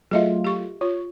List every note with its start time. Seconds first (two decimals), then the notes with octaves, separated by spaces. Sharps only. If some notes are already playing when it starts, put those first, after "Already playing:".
0.11 F#3 A3 F4 G#4 D#5 E5
0.44 G4 C#6
0.81 F4 C#5